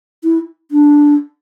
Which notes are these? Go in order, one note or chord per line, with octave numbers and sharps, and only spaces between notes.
E4
D4